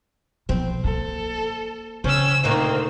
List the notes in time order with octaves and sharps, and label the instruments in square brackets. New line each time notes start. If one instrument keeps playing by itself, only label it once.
[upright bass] B1 F3 [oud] C4
[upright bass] A#3 [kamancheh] A4
[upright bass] C#3 [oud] C4 [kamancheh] C#4 E6
[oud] D2 A#2 D#3 [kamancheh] A#3 C4